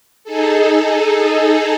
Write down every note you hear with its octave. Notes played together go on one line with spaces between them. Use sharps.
D#4 G#4 A4